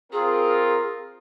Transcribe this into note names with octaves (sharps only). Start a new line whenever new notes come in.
C4 F4 G#4 A#4